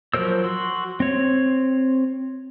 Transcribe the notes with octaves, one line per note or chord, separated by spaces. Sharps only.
F3 F#3 A#4 C5 E6
F#4 C6 E6
C4 C#5